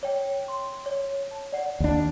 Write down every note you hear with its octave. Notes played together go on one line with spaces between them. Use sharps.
C#5 G5
C6
C#5
A5
D5 F#5
D#2 D4